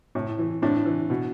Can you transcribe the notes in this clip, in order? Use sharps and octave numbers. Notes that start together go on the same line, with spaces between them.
A2
E3
A2 D4
E3
B2